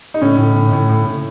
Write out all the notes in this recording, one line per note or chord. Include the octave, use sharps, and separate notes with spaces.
D#4
A2 C#4
A2
A2
A2
A2
A2